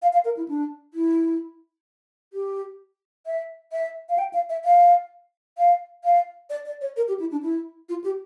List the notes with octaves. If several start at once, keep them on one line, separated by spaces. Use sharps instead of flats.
F5
F5
A#4
E4
D4
E4
G4
E5
E5
F5
G5
F5
E5
F5
F5
F5
D5
D5
C#5
A#4
G4
E4
D4
E4
F4
G4